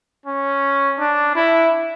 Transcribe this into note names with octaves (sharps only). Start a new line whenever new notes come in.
C#4
D4
E4